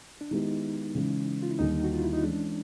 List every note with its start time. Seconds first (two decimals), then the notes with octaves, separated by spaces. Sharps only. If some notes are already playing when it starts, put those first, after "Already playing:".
0.21 D4
0.31 D#3 G#3 B3 D#4 E4 G4
0.95 C#3 E3 G#3
1.43 F4
1.51 E4
1.59 D#2 D3 G3 D#4
1.84 F#4
1.93 F4
2.03 E4
2.13 D#4
2.23 E3 G#3 C#4 D4